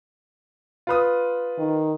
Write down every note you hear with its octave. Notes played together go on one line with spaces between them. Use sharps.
F4 B4 D#6
D#3